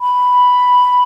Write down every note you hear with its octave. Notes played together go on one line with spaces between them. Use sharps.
B5